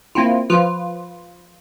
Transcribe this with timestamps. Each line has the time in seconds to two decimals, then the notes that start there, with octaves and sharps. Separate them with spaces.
0.15 A#3 C4 E4 F4
0.50 F3 F4 B4